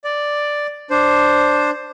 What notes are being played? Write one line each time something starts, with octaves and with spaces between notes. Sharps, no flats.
D5
D4 C5